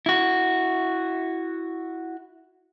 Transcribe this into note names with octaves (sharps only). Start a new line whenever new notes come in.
E4 F#4